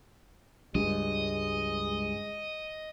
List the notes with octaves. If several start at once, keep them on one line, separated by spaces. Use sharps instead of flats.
C#2 G2 G#3 D#5